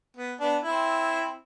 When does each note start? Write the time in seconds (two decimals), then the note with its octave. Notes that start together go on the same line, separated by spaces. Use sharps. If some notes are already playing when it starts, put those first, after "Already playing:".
0.17 B3
0.40 B3 D4
0.64 C4 E4